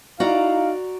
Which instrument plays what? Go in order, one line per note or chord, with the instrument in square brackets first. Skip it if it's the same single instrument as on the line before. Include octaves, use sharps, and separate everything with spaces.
[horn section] D#4 E4 F5 [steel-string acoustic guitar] F#4 D5 A#5